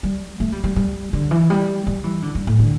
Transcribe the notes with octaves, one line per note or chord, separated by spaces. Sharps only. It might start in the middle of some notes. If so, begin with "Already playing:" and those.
G3
A3
G3
G3
G3
D3
E3
G3
G3
E3
D3
G2
A2
D3